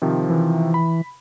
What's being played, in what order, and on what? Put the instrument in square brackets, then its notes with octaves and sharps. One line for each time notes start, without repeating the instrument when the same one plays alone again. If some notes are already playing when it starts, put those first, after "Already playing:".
[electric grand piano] C3 D#3 F3
[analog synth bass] E3
[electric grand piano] B5